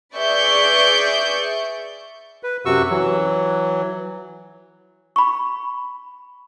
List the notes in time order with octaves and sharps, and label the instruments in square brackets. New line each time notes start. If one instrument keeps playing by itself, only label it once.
[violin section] G#4 B4 D5 E5 C#6 G6
[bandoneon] B4
F#2 C3 F#4 C#6 E6
E3 F#3
[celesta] B5 C#6